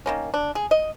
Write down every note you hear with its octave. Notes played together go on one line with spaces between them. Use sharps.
D#3 A#3 C#4
D4
G#4
D#5